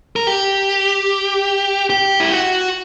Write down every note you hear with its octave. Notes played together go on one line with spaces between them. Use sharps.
A#4
G4
G4
E4
F#4